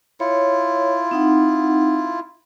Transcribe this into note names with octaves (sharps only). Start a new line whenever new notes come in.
E4 F4 C#5
C4 D#4 F#5